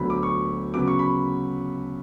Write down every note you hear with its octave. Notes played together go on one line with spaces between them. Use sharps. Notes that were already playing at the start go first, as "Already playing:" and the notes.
Already playing: D2 D3 F#3 B3 B5
D6
C#6
C#3 F#3 B3 D6
C#6
B5